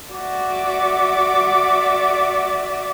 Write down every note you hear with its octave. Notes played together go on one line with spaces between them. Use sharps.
F#4 D5 E5 D6